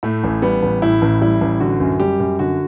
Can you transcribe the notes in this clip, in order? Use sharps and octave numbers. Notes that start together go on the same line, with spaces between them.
A2 A3
A1
G3 B3
A1
A2 E4
A1
G3 E4
A1
D3 F#4
F#2
G3 G4
F#2
D3 F#4